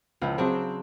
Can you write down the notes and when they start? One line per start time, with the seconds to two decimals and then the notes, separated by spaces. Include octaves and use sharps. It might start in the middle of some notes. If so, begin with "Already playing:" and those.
0.22 C#2 F3 E4
0.38 C#3 F#3 C4 D4